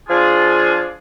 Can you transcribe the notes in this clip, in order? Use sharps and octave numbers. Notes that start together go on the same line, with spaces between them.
F3 D4 F4 G#4